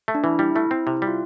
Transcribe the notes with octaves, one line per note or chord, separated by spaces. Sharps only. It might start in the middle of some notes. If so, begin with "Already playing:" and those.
A3
D4
E3 E4
G3 E4
A3 E4
C4 E4
C3 E4
E4
G3
F4